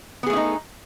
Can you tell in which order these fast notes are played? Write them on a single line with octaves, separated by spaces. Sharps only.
B3 G#4 A3 E4 D#4